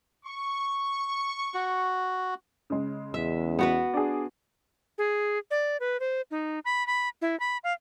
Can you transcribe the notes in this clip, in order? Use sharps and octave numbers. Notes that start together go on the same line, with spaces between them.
C#6
F#4
C#3 G#3
E2 E5
B3 F#4 B4
D4 G#4
G#4
D5
B4
C5
D#4
B5
B5
E4
B5
F5